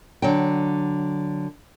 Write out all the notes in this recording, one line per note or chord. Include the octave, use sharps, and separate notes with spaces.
D3 F#3 G5